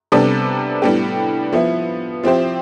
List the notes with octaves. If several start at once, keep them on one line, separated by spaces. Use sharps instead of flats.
C3 G3 B3 D4 A4
A2 G3 B3 D4 G4
F3 B3 E4
F3 C4 E4 G4 C5